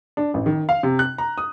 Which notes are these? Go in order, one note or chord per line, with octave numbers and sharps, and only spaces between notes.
D4
A1
D#3
F5
C3
F#6
A#5
D#6